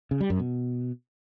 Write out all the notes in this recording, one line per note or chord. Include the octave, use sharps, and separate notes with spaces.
C#3
G3
F#2
B2